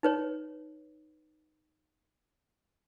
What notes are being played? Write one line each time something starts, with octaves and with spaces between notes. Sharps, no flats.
D#4 B4 C#5